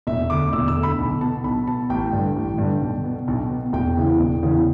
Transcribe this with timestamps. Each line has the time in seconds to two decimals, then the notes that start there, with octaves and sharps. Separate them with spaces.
0.07 E1 E5
0.30 D2 D3 D6
0.53 E1 E6
0.68 E6
0.76 D2 D3
0.83 B5
0.99 B1
1.21 B2 A5
1.44 B1 B5
1.67 B2 A5
1.90 A1 G5
2.13 G2 D3
2.36 A1
2.58 G2 D3
2.82 B1
3.04 B2
3.28 B1
3.50 B2
3.73 E1 G5
3.97 E2 C#3 E3
4.20 E1
4.42 E2 C#3 E3